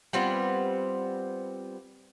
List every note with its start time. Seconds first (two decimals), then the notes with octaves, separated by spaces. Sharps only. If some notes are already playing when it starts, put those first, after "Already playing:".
0.13 G3 B3 C4 F4